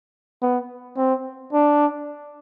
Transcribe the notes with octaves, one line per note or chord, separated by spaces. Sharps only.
B3
C4
D4